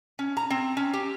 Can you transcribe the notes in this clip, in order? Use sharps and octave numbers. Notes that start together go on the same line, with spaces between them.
C#4
A#5
C4
C#4
G4